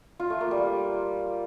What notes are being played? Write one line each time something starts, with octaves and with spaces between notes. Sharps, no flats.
F4
A3
A#3
G3